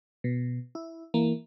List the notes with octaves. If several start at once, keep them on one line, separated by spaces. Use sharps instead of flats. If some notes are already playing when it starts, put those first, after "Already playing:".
B2
E4
E3 A#3